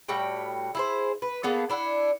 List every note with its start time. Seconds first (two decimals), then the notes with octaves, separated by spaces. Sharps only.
0.08 A2 G3 F#4 G5
0.75 E4 G#4 C5
1.22 B4
1.43 A#3 B3 G#4 A4
1.70 D4 E4 F#5